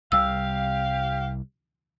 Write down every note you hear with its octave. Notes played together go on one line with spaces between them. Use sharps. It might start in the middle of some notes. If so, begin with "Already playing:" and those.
C2 C3 G3 G4 F5 E6